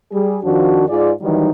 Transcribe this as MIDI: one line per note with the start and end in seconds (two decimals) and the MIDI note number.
0.12 0.37 55
0.12 0.37 68
0.43 0.83 41
0.43 0.83 51
0.43 0.83 53
0.43 0.83 62
0.43 0.83 66
0.89 1.10 44
0.89 1.10 65
0.89 1.10 68
0.89 1.10 74
1.21 1.49 51
1.21 1.49 52
1.21 1.49 54
1.21 1.49 55
1.21 1.49 63